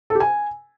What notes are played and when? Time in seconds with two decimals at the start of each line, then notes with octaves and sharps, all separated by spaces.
0.10 A4
0.15 G4
0.20 G#5